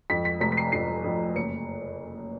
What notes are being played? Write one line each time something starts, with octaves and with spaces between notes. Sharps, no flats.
F2 B6
B6
F1 B6
B6
C7
F2 C7
F2
F#1 C#7